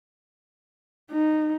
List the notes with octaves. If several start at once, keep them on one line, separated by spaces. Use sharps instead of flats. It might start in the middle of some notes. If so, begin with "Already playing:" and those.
D#4